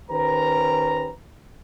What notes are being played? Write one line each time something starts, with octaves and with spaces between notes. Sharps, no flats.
D#3 C#4 G4 B4 C5 A#5